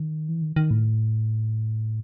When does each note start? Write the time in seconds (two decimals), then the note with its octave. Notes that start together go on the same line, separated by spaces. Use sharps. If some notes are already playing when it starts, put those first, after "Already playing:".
Already playing: D#3
0.29 E3
0.42 D#3
0.56 D#3
0.71 A2